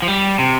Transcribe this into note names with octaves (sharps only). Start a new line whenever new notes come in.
F3
G3
C3